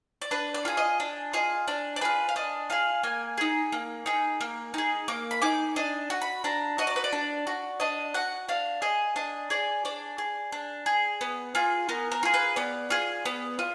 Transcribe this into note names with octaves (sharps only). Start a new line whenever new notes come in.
D5
D4 B4
D5
F4 G#4
D#5
D4
F4 G#4 D#5
D4 D5
D5
F4 G#4 B4
F5
D4 D#5
F4 G#4 F5
A#3 G#5
D#4 G#4
A#3
D#4 G#4
A#3
D#4 G#4
A#3 D6
B5
D#4 G#4 D6
D4 D#5
F#4
B5
D4 A#5
F#4 D#5
D5
B4
D5
D4
F#4
D4 D#5
F#4 F#5
D4 F5
G#4 D#5
D4 D#5
G#4 D5
D4 D5
G#4
D4
G#4
B3
F4 G#4
B3 A#4
A#4
F4 G#4
B4
B3 D5
F4 G#4
B3
F4